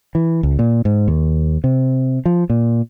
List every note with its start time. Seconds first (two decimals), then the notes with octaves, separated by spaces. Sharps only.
0.15 E3
0.43 C#2
0.59 A#2
0.85 G#2
1.08 D#2
1.64 C3
2.25 F3
2.50 A#2